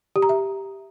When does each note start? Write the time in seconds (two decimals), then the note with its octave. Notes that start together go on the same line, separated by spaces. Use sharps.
0.16 G4
0.22 A#5
0.29 E5